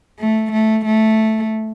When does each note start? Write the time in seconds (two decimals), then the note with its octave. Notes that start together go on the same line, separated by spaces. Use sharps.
0.19 A3
0.52 A3
0.85 A3